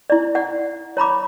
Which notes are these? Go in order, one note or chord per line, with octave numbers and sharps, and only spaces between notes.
E4 D5
D5 F#5
C#5 A#5 B5 D6